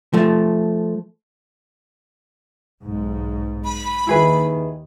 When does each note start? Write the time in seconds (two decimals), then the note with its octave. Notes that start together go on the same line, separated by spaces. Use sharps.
0.13 F3 A3
2.83 B1 G#2
3.65 B5
4.07 D#2 D#3 E4 G#4 B4